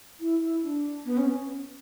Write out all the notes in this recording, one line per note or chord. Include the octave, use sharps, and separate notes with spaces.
E4
E4
D4
B3
C#4